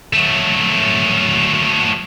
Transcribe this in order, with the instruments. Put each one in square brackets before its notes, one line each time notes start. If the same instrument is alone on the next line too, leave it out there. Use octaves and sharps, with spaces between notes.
[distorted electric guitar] F#3 A3